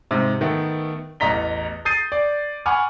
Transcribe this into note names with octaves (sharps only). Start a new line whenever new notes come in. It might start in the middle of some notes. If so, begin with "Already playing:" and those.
G#2 C3
D#3 A3 B3
A1 E2 D#5 A#5 B6 G7
D#6 G6 A6 C7 D#7
D5
F#5 G#5 B5 C#6 D6 F6